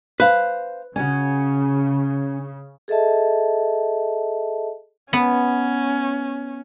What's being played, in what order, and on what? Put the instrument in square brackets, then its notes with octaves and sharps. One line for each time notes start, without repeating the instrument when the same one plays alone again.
[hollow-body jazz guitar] B4 [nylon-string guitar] C5 F5
[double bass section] C#3 [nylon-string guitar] C#4 F#4
[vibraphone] G#4 A4 D#5 E5 A5
[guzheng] B3 [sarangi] C#4